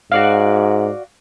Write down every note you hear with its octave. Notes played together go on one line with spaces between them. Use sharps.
G#2 F#4 D5 F5